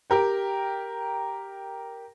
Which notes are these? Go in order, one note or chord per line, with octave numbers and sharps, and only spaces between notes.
G4 A#4 G5